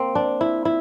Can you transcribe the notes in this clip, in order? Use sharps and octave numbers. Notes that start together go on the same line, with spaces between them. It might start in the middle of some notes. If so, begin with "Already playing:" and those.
Already playing: A#3 C4
D4
E4
E4